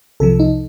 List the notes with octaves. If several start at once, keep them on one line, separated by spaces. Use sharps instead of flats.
C2 C3 F3 A4
D#4